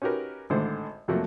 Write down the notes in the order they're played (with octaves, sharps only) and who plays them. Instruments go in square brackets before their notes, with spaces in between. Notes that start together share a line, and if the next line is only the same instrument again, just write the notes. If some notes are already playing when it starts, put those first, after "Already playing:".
[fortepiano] C#4 D#4 F#4 G4 A#4 B4
G#1 A2 D3 C5
F2 C3 F3 F#3 A3 A#3